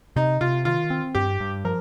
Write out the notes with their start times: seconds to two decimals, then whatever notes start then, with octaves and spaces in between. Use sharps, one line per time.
0.16 C3 D#4
0.41 C3 F4
0.65 D#3 F4
0.90 C4
1.15 G2 G4
1.40 G2
1.64 F3 A#4